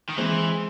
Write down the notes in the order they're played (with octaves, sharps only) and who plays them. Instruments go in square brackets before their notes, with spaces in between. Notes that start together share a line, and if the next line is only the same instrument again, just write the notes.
[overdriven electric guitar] D#3
[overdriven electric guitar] E3 [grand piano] G#3 C4